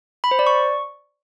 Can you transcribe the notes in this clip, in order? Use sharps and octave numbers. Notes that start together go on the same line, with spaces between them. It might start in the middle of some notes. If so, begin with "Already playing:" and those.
B5
C5
D5
C#6